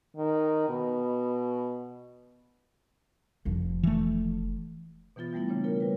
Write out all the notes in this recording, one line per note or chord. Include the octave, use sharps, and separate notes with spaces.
D#3
B2
F1 F3
E3 A3
B2 E3 B3 F4 A6
E3 G3 A3 B3 E4
C#3 A#3 D4
F4 A#4 C#5
G3 B4